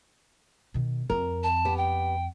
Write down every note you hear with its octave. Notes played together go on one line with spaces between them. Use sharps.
B2 D#3
F2 C4 A#4
A5
B3 G4
G5